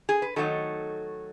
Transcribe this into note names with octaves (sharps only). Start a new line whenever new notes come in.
G#4
B4
D#3 F#3 A3 D#4 A4